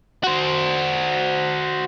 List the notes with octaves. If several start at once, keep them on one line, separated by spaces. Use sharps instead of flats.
F#4 C5